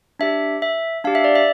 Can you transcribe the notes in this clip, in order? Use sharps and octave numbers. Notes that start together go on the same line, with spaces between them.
D4 G4 E5
E5
D4 G4 F5
E5
D5
E5